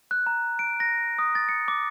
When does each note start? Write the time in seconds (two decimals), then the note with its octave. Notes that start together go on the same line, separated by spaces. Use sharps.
0.11 F#6
0.27 A#5
0.59 D7
0.80 A#6
1.19 D#6
1.35 A6
1.49 C#7
1.68 D6